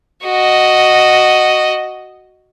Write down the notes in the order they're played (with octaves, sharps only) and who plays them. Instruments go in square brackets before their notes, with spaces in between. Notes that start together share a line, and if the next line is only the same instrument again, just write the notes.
[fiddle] F#4 D#5